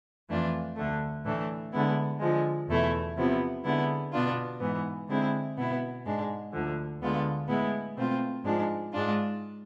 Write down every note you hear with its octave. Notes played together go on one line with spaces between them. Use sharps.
F2 E3 A3 D4 F4
D2 D3 A3
A2 E3 A3 D4
D3 G#3 B3 E4
D3 F3 G#3
E2 B2 A3 E4
C3 F3 B3 E4
D3 G#3 B3 E4
B2 B3 D4 F4
G#2 E3 B3
D3 G#3 C4 E4
B2 B3 E4
G#2 G#3 D4
D2 D3 F3
D2 D3 G#3 B3 F4
A2 G#3 B3 E4
B2 A3 C4 F4
G#2 F3 G#3 D4
G#2 G#3 D4 F4